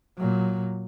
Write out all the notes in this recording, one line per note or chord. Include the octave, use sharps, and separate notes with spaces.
A#2 F#3